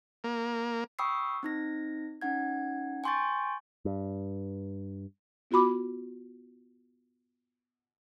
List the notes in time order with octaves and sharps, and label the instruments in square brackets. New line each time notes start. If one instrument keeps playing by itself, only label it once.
[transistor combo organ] A#3
[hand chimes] G5 B5 C#6 D#6 E6 C7
C4 D#4 A#6
C#4 D#4 F#5 G#6
G5 G#5 C6 C#6 G6 A6
[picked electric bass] G2
[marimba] B3 F4 F#4 B5 D6